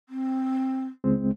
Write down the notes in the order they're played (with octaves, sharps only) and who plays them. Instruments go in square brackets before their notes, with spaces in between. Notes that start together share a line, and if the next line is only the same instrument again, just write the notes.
[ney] C4
[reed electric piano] C#2 G#3 C4